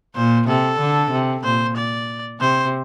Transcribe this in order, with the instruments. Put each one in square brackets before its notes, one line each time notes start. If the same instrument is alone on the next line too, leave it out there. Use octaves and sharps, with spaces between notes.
[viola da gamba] A#2 [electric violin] C5
[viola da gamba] C3 [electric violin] A4
[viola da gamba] D3
C3
[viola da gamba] A#2 [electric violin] C5
[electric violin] D5
[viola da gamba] C3 [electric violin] C5